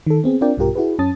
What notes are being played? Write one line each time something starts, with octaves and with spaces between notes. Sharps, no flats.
D#3 A4
B3 C4 G#4
C4 D4 F4 A#4 D5 G5
A#1 G2 B2 F4 G4 A#4
E4 F#4 G#4 B4
F#2 C#4 A5 D#6 A6